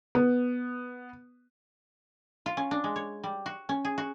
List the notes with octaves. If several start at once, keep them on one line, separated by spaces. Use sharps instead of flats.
B3
F4
C#4
D4
G#3
C#5
G3
F#4
C#4
G#4
F#4